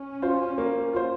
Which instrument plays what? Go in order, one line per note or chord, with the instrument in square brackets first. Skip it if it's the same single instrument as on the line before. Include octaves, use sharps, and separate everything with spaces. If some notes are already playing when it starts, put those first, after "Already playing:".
Already playing: [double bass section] C#4
[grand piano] F4 C5
A#3
F4 C5